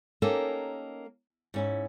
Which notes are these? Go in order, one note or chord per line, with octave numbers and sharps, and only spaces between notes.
A#3 C#4 D#4 G4 A4
G#2 C#4 E4